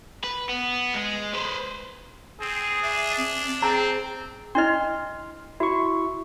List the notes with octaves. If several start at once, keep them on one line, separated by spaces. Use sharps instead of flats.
B4
B3
G#3
B4 C5
C4 G#4
D4 E5
C4
C4 G#4 A#5
D4 E4 D#5 C6 F6
E4 F#4 C#6